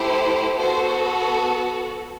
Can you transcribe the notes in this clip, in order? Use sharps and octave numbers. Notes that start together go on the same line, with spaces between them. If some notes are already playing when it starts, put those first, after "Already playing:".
Already playing: A3 E4 G4 C5
B3 F#4 A4 C5